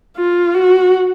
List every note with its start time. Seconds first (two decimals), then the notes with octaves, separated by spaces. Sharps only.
0.17 F4
0.54 F#4